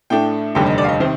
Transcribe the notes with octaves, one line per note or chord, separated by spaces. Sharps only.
A2 A3 D4 G5
F1 D#2 D3 G3 G5
D#5
D5
F5
D#5
C3 D#3 C5